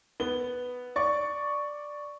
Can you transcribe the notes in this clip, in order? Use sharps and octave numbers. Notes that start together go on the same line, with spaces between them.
B3 G7
D5 C#6